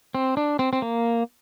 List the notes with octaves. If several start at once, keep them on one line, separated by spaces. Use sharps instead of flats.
C4
D4
C4
C4
A#3